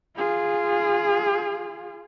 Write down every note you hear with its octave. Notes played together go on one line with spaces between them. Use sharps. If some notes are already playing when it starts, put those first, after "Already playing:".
F4 G#4